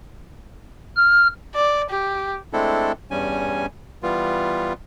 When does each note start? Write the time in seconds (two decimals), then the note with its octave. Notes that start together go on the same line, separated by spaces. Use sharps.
0.96 F6
1.54 D5
1.90 G4
2.53 G#3 A3 C4 D4 E4 A4
3.11 E2 G2 G3 C#4 G#5
4.03 E3 G3 B3 F4